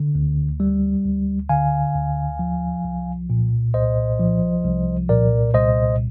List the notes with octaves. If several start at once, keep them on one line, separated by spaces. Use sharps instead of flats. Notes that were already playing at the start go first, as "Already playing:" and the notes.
Already playing: D3
D2
G3
D2
D3 F5 G#5
D2
F3
C2
A#2
C2 C5 D#5
F3
C2
A#2 A#4 D5
C2 C5 D#5